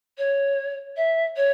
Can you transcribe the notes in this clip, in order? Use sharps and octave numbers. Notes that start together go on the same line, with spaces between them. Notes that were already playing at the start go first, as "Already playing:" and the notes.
C#5
E5
C#5